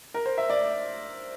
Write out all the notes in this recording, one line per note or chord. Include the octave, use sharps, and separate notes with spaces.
A#4
C5
E5
D5